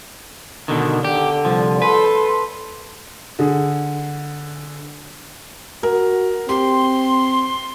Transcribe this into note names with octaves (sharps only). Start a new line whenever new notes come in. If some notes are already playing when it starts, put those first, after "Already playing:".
B2 D3 D#3
D3 G4
C2 F3
A4 B4 C6
D3 G#4
F#4 A#4
C4 G4 C6